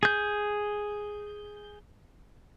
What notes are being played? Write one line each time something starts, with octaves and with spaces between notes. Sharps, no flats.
G#4 G6